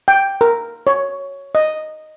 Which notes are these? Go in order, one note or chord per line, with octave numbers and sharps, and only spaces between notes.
G5
A#4
C#5
D#5